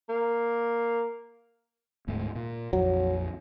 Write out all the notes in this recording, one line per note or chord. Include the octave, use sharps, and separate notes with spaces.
A#3
D1 G#2 A3
A#2
A#1 F2 F#3